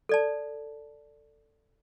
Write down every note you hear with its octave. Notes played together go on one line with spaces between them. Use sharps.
A4 D5 A5